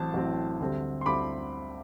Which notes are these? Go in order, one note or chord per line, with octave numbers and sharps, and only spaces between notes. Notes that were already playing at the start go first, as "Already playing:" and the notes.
Already playing: A1 A2 F#3 C4 A5
A1 A2 F#3 C4
D2 D3 G3 C4
C6
D2 D3 G3 C4 B5 D6